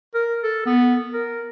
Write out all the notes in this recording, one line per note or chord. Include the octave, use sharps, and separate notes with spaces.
A#4
A4
B3
A#4